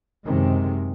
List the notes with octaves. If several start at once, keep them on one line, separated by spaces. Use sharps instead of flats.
F#1 F#2 C3 D#3 G#3